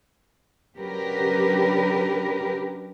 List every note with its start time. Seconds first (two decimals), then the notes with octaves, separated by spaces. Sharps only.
0.77 C#3 F#3 D4 G4 A#4 B4